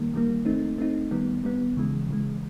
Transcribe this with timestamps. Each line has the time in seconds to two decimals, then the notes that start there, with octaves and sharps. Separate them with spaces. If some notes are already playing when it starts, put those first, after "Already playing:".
Already playing: D#3 G3 A#3
0.14 D#3 G3 A#3
0.45 A3 C4 D#4
0.78 A3 C4 D#4
1.11 D#3 G3 B3
1.44 D#3 G3 B3
1.77 C#3 E3 G#3
2.08 C#3 E3 G#3